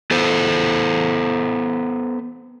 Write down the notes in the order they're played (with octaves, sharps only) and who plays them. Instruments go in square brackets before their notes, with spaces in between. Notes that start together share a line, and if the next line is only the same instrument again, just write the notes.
[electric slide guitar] B3 A4 C5